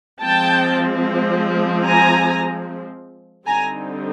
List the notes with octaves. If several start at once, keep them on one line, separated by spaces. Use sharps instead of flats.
F3 G#3 C4 G5 A5
G#5 A#5
D3 G3 C4 D#4 G#5 A#5